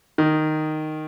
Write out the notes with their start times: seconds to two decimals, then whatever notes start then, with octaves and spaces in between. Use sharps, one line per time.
0.18 D#3